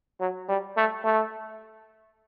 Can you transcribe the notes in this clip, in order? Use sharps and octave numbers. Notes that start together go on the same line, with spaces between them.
F#3
G3
A3
A3